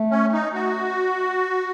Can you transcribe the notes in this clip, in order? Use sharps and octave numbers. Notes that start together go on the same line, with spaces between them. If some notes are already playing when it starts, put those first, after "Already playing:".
Already playing: A3
C#4
D#4
F#4